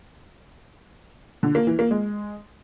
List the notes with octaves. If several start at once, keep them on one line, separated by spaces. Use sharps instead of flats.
D3
A#3
E3
A#3
G#3